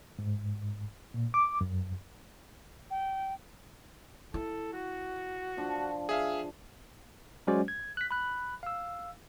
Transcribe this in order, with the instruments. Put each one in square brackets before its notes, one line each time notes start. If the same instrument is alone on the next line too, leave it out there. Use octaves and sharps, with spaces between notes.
[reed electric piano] G#2
A#2
D6
F#2
[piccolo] G5
[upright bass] E4 [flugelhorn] A4
[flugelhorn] F#4
[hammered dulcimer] F3 D4 F4
[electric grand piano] G#4 E5 F5
[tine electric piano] F#3 G#3 C#4 F#4 C5 D5
G#6
F#6 B6
B5 F#6
F5 E6